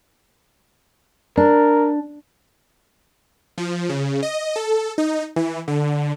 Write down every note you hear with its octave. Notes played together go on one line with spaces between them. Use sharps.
D4 A#4
F3
C#3
D#5
A4
D#4
E3
D3